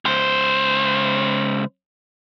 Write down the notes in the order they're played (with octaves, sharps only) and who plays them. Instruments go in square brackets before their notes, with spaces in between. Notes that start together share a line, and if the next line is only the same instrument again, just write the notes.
[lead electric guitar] C#2 C5